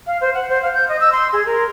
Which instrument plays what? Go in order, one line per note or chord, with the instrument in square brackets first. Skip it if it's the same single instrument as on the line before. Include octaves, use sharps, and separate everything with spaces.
[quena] F5
C5
F#5
C5
F5
G6
D#5
E6
C6
G#4
A#4